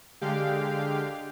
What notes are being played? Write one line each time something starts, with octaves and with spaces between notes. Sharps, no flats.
D3 G#3 G4 F5 G5